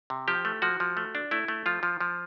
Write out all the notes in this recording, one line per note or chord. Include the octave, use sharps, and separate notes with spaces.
C3
F3 G4
A3
F3 F#4
F3
A3
D4
A3 E4
A3
F3 F4
F3
F3